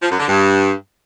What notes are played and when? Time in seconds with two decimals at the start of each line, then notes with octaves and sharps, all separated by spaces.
0.02 F3
0.11 F#2
0.20 D3
0.28 G2